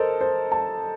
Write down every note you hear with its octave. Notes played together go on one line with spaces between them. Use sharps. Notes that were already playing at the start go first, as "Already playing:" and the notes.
Already playing: A4 A#4 C5 D#5
C5
A5